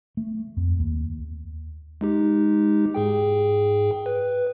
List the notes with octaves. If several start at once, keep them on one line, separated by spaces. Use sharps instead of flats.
A3
F2
D#2
G#3 D#4 G4
G#2 G#4 G5
B4